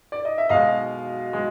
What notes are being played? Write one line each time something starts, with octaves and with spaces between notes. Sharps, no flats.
D5
D#5
E5
B2 G#3 D#5 F5
G#3